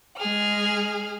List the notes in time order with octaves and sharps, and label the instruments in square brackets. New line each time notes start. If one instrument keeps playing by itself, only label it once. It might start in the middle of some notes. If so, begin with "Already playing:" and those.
[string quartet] G#3 G#4 F6